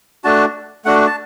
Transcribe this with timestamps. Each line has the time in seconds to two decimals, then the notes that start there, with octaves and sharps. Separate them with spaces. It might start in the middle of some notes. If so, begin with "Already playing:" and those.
0.24 A3 D4 F#4 A5
0.85 A3 D4 F#4 F#5
1.07 A5